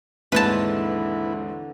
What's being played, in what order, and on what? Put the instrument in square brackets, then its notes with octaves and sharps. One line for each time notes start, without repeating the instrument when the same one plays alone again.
[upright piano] D#2 G#2 C4 [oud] D3 E3 [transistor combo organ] E4 [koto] B4 A5